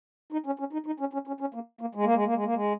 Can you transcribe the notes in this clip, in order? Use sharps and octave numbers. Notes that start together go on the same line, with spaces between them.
D#4
C#4
C#4
D#4
D#4
C#4
C#4
C#4
C#4
A#3
A#3
G#3
A#3
G#3
A#3
G#3
A#3
G#3